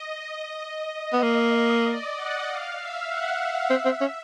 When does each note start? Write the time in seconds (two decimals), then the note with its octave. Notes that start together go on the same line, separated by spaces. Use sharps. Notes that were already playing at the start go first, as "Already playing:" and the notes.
Already playing: D#5
0.61 D#5
1.13 B3
1.23 A#3
1.84 D5
2.16 F#5
2.47 F5
2.78 E5
3.08 F#5
3.39 F5
3.70 C4 E5
3.85 C4
4.01 C#4